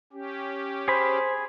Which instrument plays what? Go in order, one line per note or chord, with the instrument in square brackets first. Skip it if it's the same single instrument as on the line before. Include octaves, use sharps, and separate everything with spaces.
[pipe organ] C#4 G4
[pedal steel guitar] G#4 B5 [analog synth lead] C5